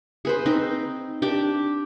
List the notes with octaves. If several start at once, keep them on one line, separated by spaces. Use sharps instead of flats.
G#4 B4 C5
C4 D#4
D4 G4